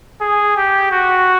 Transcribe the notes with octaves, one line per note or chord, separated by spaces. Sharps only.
G#4
G4
F#4